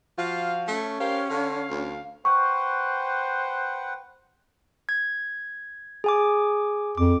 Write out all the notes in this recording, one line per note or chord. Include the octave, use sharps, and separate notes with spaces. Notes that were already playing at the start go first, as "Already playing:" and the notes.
F3 F4 F#4 F5
A3 C#4
G4 A#4 C5 F5
D3 F5
D2
B4 C5 F#5 G5 C#6
G#6
G#4 G#5 D6
F2 D6